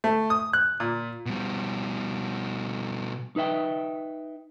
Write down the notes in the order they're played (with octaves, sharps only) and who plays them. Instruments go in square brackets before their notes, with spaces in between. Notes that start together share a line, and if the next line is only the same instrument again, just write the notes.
[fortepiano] A3
D#6
F#6
A#2
[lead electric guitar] B2 G3
[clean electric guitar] D#4 B4 E5 G5